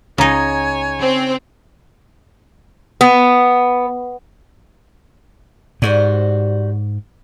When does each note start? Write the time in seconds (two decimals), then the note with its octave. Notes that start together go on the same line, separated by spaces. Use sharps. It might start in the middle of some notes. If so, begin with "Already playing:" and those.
0.18 C#2 C#3 D#4 C#5 G#5 A#5
1.01 C4
3.01 B3
5.82 G#2 G3 F#4 C5